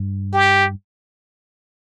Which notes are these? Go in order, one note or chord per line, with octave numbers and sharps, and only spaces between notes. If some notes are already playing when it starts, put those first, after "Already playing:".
Already playing: G2
G4